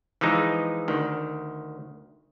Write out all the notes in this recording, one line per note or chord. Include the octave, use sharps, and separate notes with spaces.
E3 F3 G#3 D#4
D2 D#3